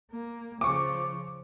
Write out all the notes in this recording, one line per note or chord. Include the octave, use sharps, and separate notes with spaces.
A#3
C#3 F3 C#6 D6